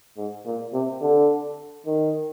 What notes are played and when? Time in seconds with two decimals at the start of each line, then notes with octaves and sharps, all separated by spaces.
0.18 G#2
0.46 A#2
0.74 C3
1.02 D3
1.87 D#3